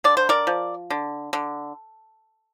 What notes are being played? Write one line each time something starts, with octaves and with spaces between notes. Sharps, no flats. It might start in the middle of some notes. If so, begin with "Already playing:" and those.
D3 D5
C5
A#4 D5
F3
D3
D3